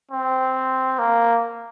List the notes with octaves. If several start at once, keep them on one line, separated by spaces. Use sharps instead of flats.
C4
A#3